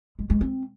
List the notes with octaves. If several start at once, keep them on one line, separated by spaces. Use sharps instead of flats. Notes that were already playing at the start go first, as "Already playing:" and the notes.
G#3
G#3
C4